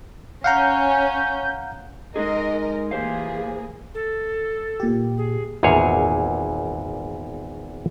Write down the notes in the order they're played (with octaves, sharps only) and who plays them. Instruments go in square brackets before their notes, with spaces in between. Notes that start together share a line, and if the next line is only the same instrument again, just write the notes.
[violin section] C#4 [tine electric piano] F5 F#5 A#5 [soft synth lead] G6
[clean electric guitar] G#3 D#4 G#4 [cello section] A#4 D#5
[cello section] E3 A#3 G#4 [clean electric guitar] G4 C5 F5
[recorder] A4
[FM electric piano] A#2 G4
[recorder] G#4
[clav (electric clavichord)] G#1 E2 A#2 G#4 C#5